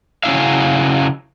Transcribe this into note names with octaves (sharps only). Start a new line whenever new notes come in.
C#3 F#3 C#4 E4 E5 F5